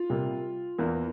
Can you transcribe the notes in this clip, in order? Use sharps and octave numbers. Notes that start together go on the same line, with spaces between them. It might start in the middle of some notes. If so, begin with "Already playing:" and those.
Already playing: F4
C3 G3 A#3
E2 E3 A#3